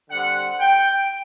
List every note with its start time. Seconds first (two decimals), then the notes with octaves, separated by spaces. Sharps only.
0.10 D3 G3 C4 F#5
0.60 G5